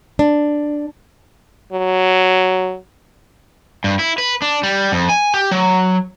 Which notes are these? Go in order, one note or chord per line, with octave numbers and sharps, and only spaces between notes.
D4
F#3
G2
E4
B4
D4
G3
F2
G#5
G4
F#3